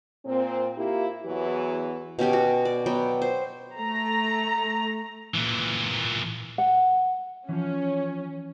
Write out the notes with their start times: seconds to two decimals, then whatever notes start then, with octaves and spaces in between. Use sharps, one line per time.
0.25 A#2 C4
0.77 A#3 E4 F4 G4
1.25 E2 E3 F#3 B3 F#4
2.19 B2 C#4 G4 G#5
2.33 F#4
2.65 D5
2.86 F#3 B3 G5
3.22 C5
3.78 A3 A#5
5.34 A#2 E3
6.58 F#5
7.49 E3 F3 C#4